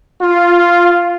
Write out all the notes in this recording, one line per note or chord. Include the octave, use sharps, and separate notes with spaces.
F4